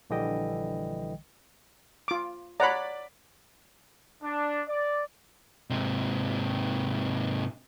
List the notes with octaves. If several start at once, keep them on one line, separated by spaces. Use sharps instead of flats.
A#1 D3 E3 G3 D#5 G5
F4 D6
C#5 D5 F#5 A#5 B5
D4
D5
G#2 C3